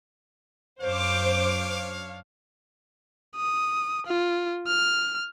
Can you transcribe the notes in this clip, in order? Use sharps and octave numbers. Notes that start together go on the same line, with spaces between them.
F#2 D4 C5 C#5 F5 D6
D#6
F4
F6